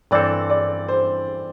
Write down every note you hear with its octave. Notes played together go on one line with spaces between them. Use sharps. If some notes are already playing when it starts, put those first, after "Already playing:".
G2 E3 C4 A4 D5
D5
C5